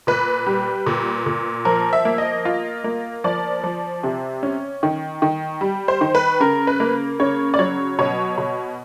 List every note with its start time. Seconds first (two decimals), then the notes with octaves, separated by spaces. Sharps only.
0.07 A#2 B4
0.46 G3
0.86 A#2
1.26 A#2
1.65 F3 A#4
1.93 E5
2.05 A#3
2.18 D#5
2.45 F4
2.84 A#3
3.24 F3 D5
3.64 F3
4.03 C3
4.43 C#4
4.83 D#3
5.22 D#3
5.61 G3
5.88 C5
6.01 D#3
6.15 B4
6.40 C#3 A#4
6.67 B4
6.80 A#3
7.20 C#3 C#5
7.54 D5
7.59 F#3 C#5
7.99 B2 C#5
8.38 B2